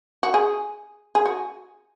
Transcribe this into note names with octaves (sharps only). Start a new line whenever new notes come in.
F#4
G#4
G#4
F#4